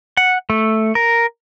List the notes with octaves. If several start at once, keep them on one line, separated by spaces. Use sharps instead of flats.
F#5
A3
A#4